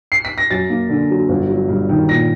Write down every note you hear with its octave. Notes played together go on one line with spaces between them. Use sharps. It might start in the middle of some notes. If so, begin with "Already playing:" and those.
C7
B6
A#6
F#2 A6
A#3
D3
F#3
G1
F#3
G2
D#3
A#2 A#6